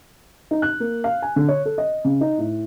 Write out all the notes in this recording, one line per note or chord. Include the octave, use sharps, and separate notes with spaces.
D#4
F#6
A#3
F5
G#5
D3
C#5
A4
D#5
C#3
D#4
A2